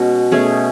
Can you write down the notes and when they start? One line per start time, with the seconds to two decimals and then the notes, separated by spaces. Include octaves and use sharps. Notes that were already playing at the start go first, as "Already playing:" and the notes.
Already playing: B2 G#3 C#4 F#4
0.32 B2 A3 C#4 G#4